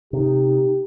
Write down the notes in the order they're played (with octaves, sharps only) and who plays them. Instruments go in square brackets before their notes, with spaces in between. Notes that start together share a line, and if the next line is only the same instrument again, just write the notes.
[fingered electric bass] C3 [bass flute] D#4 [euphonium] G4